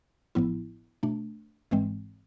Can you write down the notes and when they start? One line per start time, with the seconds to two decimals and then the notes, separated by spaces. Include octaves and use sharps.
0.35 A1 A2 F3 B3 E4
1.03 B2 A3 D4
1.71 G#1 G#2 E3 G#3 C4